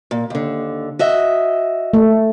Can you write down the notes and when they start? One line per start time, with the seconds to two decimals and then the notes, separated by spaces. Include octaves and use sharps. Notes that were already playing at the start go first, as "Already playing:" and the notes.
0.11 A#2
0.30 D#2 D3
0.99 F#4 D#5 E5
1.93 A3